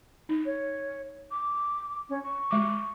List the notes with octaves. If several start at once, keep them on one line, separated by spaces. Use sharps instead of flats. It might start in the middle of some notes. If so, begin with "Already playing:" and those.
D#4
C#5
D6
C#4
C#6
G#3 D6